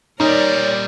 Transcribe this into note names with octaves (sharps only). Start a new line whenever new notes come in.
A#2 G3 D#4 A#4 C#5 D5